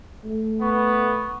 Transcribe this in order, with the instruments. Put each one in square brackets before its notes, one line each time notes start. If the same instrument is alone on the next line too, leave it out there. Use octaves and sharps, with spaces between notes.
[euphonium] A3
[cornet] B3 [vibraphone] C#6